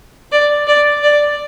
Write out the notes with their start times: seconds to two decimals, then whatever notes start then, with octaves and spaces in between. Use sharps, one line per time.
0.32 D5
0.67 D5
1.03 D5